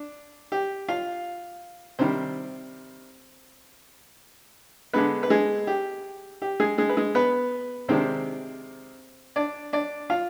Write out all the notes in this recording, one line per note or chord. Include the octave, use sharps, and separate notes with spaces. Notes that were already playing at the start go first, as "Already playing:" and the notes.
Already playing: D4
G4
F4 F5
C3 D#3 G3 C4 C5
D3 G#3 B3 B4
B4
G#3 G#4
G4
G4
G#3 G#4
G#3 G#4
B4
G#3 G#4
B3 B4
C3 D#3 G#3 C4 D4 C5
D4 D5
D4 D5
F4 F5